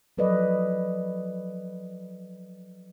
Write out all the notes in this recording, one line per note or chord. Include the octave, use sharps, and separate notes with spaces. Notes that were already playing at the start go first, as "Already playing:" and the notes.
F3 F#3 A4 B4 D5 D#5